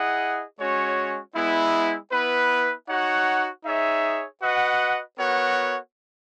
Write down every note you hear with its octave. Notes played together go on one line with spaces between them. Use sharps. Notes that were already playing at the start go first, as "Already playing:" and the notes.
Already playing: E4 G#4 D#5 F#5
G#3 C#4 F#4 C#5
G#3 B3 E4
B3 E4 B4
D#4 F#4 C#5 F#5
D#4 G#4 C#5 E5
F#4 B4 D#5 F#5
B3 F#4 A#4 C#5 F#5